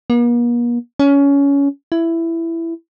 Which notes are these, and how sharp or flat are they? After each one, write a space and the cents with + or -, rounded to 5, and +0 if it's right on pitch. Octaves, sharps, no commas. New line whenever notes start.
A#3 +45
C#4 +20
E4 +10